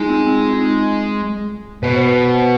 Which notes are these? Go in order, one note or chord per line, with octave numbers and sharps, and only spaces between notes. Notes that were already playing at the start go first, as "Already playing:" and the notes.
Already playing: G#3 D#4 F4
C4
C4
D#4
B2 B4
C5
B4